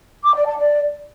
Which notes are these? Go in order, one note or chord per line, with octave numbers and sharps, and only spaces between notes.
D6
D5
A5
D5